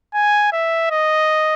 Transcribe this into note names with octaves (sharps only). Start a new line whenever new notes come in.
G#5
E5
D#5